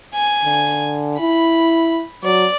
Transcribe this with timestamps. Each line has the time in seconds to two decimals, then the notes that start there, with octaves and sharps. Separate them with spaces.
0.14 G#5
0.44 D3
1.20 E4 B5
2.24 F#3 D5